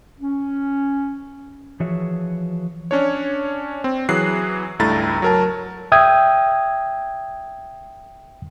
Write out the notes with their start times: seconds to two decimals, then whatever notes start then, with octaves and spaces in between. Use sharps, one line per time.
0.19 C#4
1.80 E3 F3 F#4 G#4 C#5 E5
2.91 C#4 D4 C#5
3.84 C4
4.09 E3 F#3 G#4 F#6 C7
4.79 C#2 G2 A3 E4 A#5 A6
5.22 F#3 A#4 A5
5.92 E5 G5 D#6 G#6